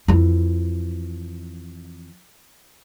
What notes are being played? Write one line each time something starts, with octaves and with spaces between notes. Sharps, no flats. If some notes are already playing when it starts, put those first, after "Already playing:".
F2 E3